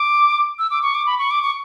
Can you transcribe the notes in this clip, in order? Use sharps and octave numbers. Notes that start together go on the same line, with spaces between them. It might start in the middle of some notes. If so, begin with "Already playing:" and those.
Already playing: D6
E6
D6
C#6
D6
B5
C#6
D6
C#6